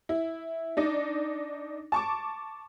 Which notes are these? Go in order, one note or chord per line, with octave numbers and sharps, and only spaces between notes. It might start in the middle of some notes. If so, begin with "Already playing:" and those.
E4
D4 D#4
A5 C#6 D6